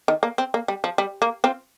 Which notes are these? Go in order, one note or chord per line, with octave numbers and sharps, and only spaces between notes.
D#3
A#3
C4
A#3
G3
F3
G3
A#3
C4 F4